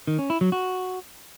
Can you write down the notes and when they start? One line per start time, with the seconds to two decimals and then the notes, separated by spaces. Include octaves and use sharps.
0.08 D#3
0.19 C#4
0.30 E4
0.41 F#3
0.52 F#4